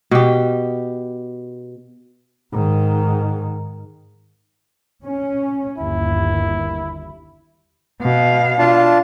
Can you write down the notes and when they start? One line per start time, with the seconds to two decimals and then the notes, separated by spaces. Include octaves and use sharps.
0.11 B2 G4
2.52 G#2 D#3
5.04 C#4
5.78 G1 D#2 E4
8.01 B2 F5
8.59 D4 F4 A5